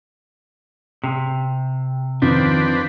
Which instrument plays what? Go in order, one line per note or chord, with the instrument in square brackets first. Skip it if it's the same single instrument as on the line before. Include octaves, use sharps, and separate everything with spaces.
[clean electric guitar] C3
[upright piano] F2 [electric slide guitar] D#3 [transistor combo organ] C4 D4 B4